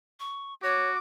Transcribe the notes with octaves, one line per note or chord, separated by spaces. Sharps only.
C#6
F#4 C#5 D6